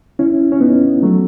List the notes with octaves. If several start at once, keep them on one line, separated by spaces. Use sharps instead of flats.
C#4 E4
C#4
B3 D#4
F#3 A3